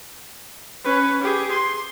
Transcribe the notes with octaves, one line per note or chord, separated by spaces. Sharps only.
C#4 B4
G4 G#4
C6